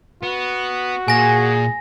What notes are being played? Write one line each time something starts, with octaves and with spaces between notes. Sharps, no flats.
B3 F#4
A#2 G#4 G#5 A#6